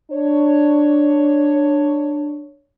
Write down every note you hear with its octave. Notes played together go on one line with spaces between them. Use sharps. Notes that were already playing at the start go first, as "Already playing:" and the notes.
D4 C#5